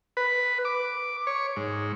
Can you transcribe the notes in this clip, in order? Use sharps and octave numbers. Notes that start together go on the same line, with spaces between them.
B4
D6
C#5
G#2